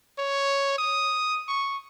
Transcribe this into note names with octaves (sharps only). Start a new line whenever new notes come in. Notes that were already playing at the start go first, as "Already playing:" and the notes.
C#5
D#6
C#6